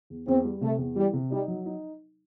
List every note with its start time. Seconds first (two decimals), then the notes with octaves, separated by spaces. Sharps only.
0.10 E2
0.27 E2 C4
0.45 G3
0.61 C3 A3
0.79 E2
0.96 E3 G3
1.13 C3
1.31 G3 D#4
1.48 F#3
1.66 D#4